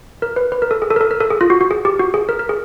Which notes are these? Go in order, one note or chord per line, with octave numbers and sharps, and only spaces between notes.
A#4
B4
B4
A#4
A4
G#4
A4
A#4
A4
A#4
A4
G#4
F4
F#4
F#4
G#4
G4
F#4
G#4
A#4
A#4
G#4